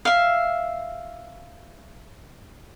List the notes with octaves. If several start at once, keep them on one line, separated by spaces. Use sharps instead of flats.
E5 F5